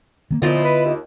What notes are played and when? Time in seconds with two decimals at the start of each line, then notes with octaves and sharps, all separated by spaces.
0.31 D#3 A3 A#3
0.42 A#2 D3 F3 B3 E4 F4 D#5
0.64 B4
0.85 D#2